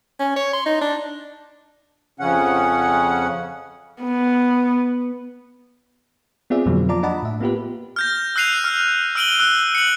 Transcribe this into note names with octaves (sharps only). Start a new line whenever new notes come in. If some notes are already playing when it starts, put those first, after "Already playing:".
C#4
C#5
C6
D#4
D4
F2 C#3 C#4 F#5
B3
B3 C4 F4 G#4 D5 E5
F2 B2 D3 F3 F#3 A#3
F4 D5 A5 A#5 D6
D4 D5 D#5 F#5 A5 B5
A2 E5
A#3 B3 F4 G4 B4
F6 G6 A#6
E6 F#6 G6 C7 D#7 F7
F6
E6 F6 D7 D#7 F#7 G7
E6 F#6
C#7 F#7